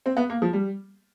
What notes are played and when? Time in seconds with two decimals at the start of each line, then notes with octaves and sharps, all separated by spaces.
0.06 C4
0.17 B3
0.30 A#3
0.42 F3
0.53 G3